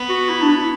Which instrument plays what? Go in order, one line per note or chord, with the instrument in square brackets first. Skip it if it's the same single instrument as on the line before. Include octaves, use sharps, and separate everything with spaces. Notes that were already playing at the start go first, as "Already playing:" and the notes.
Already playing: [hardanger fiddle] B3
[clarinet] F#4
E4
D4
E4